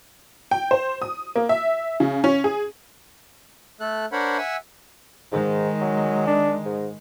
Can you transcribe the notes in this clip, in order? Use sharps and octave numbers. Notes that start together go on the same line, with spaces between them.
G5
C5
D#6
A#3
E5
C#3
C#4
G#4
A3 A4 F#6
D4 A#4 C5 C#5 F#5 B5
E5 F#5 G#5 E6
G#2 D#3 G#3
F#3
D4
G#2